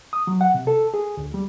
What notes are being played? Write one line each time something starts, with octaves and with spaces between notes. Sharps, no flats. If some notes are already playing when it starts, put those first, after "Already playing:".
D#6
F#3
F#5
C3
A4
G#4
D2
G3